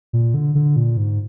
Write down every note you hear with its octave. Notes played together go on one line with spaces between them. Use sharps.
A#2
D3
D3
A#2
G#2